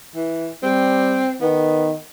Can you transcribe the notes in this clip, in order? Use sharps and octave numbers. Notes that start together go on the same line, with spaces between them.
E3
G3 C4
D#3 B3